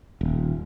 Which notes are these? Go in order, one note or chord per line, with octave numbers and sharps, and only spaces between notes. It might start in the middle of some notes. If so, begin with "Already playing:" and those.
D#1